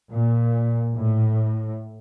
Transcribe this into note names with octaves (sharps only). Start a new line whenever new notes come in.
A#2
A2